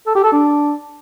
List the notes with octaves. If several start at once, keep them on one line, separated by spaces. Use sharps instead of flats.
A4
G4
A4
D4